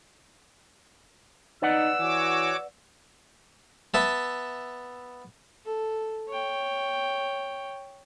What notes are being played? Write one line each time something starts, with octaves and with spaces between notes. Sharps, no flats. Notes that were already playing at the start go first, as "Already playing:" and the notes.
D#4 B4 D5 F#5 E6
E3 F#4 C#5 D6
B3 E5 A5
A4
C#5 G5